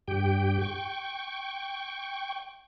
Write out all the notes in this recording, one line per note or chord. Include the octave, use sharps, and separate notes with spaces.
G2 G4 G5
G5 C#6